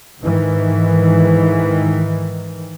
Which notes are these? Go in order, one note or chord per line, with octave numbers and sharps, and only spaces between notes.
G#2 D#3 E3